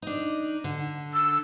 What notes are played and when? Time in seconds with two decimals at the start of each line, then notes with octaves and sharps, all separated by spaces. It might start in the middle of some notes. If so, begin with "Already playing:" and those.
0.02 D4 D#4
0.64 D3
1.14 E6